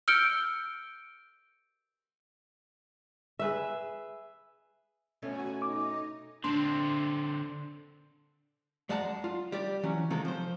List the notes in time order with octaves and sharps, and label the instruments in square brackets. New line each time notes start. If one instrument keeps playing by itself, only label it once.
[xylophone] E6 F6 G6 C#7 D7 G7
[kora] G#4 B4 E5
[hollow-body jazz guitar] B2 A3 C#4 [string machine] F#4 G#5
[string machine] D#4 D#5 [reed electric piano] D6
[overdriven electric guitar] D3 C4 [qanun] D4 [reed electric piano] C6
[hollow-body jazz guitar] F#2 G#3 D5 F#5 A5 A#5
F4
G3 G4 D5
E3 F#3 C#4
C3 D#3 G#3 C4 F4 A4
F3 C5